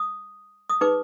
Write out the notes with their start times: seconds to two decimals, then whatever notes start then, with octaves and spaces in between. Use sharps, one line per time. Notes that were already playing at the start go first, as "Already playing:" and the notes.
Already playing: D#6
0.69 D#6
0.81 D#4 G#4 B4 D6